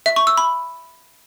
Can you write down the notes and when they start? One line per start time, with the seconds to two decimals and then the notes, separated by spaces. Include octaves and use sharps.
0.06 E5
0.16 C#6
0.27 E6
0.37 B5